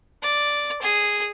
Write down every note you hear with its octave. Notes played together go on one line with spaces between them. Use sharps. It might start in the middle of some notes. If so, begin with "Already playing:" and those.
D5
G#4